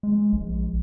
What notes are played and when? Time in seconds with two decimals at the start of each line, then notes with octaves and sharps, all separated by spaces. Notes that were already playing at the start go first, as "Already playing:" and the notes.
0.03 G#3
0.33 A#1